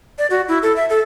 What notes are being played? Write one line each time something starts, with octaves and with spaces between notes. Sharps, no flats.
D5
F#4
E4
A4
E5
A4